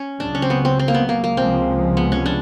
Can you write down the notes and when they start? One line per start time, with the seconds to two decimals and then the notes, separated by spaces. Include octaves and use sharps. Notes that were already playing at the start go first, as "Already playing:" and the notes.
Already playing: C#4
0.20 C#2 C#3 F#3 D4
0.35 C#4
0.42 C4
0.50 B3
0.65 C4
0.79 C4
0.88 A#3
0.94 B3
1.09 A#3
1.24 A#3
1.37 C#2 C3 F3 G#3 C4
1.97 B3
2.12 C#4
2.26 D4